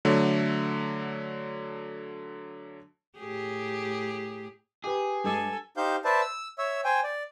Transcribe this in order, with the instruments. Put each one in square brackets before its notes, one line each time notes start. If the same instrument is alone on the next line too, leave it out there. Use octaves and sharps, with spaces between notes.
[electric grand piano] D3 F#3 A3
[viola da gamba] A2 G4 G#4
[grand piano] G4 B4 [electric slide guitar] G#4
[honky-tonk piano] G2 G#3 D6 [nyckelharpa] A4 G#5
[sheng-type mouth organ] D#4 G4 C5 F5 G6
B4 C5 D5 E5 A5
E6
C#5 E5 E6
C5 G5 G#5
D5